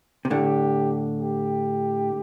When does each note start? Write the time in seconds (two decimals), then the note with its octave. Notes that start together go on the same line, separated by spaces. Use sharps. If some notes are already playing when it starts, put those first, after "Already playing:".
0.25 C3
0.30 A2 D3 G4
1.21 G4